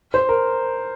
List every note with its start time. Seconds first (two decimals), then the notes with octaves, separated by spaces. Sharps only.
0.14 C5
0.29 A#4